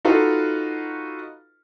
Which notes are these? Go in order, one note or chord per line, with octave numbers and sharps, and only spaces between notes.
D#4 F4 F#4 A4 B4 F5